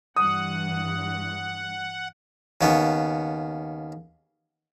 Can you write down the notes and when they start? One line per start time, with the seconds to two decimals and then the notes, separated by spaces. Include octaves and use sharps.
0.16 G2 E3 F#5 D#6
2.61 D#2 C#3 B3